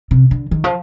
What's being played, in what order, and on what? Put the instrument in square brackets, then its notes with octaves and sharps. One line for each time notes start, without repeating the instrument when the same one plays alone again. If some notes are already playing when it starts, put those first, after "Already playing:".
[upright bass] C3
D3
D#3
F3